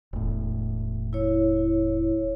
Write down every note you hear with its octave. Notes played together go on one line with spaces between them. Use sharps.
E1 A2
E4 C#5